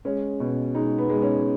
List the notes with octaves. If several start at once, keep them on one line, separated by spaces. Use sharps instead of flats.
G#3 C#4
B2
G#3 D#4
B3
G#3
C#4